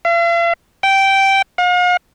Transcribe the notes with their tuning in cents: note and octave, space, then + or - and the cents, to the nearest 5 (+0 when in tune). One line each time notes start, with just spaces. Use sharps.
F5 -45
G5 -10
F5 +45